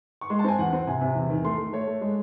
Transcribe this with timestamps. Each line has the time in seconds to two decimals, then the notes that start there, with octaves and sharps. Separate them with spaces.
0.21 C#6
0.30 G#3 C6
0.39 A5
0.44 C4 G#5
0.58 E2 F#5
0.73 C4
0.87 C3 G#5
1.01 C3
1.15 E2
1.30 D#3
1.45 A3 C6
1.58 A3
1.73 A3 C#5
1.87 A3
2.01 G#3